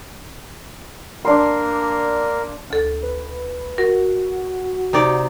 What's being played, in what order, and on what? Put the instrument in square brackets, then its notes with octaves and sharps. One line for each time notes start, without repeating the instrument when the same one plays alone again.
[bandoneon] A#3 A#4 [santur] D4 C6
[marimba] D2 A4
[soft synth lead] B4
[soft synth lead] F#4 [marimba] A#4
[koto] C3 D#4 D5